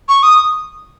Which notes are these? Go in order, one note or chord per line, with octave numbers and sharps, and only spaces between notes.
C#6
D#6